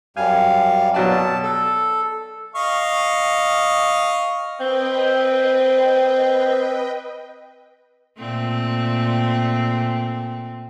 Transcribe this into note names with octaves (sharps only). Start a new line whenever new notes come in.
F#2 G3 F5 G#5
B2 F#3 D5 A5
A4
D#5 F5 C#6
C4 B4 D#5 G5
A#2 A3 C4